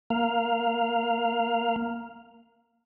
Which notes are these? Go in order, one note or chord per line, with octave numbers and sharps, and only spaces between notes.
A#3 F5